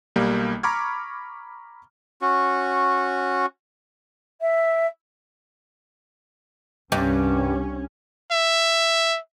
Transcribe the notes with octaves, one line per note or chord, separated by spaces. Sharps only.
B1 G3 A#3
A#5 B5 C#6 D6 F6 G#6
C#4 F#4
E5
C2 G2 C#4
E5